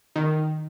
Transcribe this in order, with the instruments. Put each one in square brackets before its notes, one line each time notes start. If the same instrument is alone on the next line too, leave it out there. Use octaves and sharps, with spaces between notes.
[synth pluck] D#3